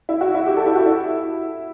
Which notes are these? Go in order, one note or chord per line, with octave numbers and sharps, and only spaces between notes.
E4
F#4
E4
G4
A4
E4
F#4
E4